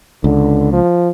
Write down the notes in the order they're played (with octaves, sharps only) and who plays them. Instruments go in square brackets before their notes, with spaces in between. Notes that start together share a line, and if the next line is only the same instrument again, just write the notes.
[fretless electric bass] C#2 [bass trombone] D3
[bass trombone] F3